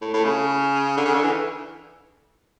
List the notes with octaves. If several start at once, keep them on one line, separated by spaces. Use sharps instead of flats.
A2
A2
C#3
D3
C#3
D3
E3